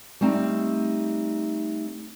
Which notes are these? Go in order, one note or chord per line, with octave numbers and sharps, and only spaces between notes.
G3 A3 C4 D#4